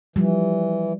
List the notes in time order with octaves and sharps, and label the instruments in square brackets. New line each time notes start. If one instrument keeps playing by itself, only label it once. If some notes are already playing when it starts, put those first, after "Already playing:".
[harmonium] E3 [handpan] F3 G3